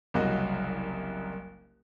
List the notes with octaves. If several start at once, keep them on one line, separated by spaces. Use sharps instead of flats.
F#1 C2 A#3 F#4 D#5